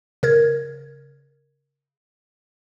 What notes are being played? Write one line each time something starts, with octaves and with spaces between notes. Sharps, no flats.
C#3 A#4 G#6